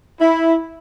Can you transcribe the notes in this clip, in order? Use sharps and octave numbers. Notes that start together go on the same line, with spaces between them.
E4